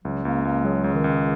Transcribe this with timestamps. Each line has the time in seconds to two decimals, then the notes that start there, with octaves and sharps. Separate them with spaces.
0.04 C#2 F#3
0.24 C#2 A#3
0.45 C#2 A#3
0.65 F#3 G#3
0.84 C#2
0.95 D#3
1.04 C#2